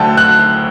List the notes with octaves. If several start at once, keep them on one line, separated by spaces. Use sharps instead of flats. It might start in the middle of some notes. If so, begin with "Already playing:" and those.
Already playing: D2 D3 F#3 G5 A5
F#6